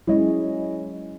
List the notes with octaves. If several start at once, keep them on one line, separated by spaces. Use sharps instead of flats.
F#3 G#3 C#4 E4 C#5 D#5